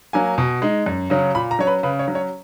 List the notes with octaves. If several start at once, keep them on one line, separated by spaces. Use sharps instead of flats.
F#3 A#3 G#5
B2
G#3 D#4
F#2
C#3 F#3 C#4
A#2 B5
A#5
F#3 C#4 C#5
B4
C#3 B4
C#5
F#3 C#4
C#5